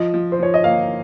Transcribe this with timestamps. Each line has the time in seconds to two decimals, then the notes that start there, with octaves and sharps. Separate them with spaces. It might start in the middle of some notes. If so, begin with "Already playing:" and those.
Already playing: F3 D#5
0.14 F3
0.32 C5
0.39 F3 C#5
0.54 D#5
0.64 A#3 F5